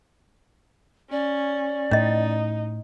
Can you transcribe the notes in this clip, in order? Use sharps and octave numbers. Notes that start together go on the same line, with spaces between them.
C#4 D5
A2 C#4 D#4 D#5